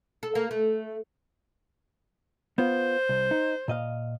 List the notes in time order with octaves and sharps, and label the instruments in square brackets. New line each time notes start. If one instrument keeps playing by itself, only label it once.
[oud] A4
A#3
A3
[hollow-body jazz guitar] B3 F4 [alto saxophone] C5
[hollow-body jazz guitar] C2
D#4
A#2 D#5 F5